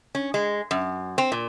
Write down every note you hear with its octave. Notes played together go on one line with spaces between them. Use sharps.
C#4
G#3
F#2
C4
A#2